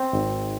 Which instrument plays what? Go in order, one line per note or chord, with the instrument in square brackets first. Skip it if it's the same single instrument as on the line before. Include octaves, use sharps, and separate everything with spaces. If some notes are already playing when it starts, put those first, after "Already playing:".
Already playing: [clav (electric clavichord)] C4
G#1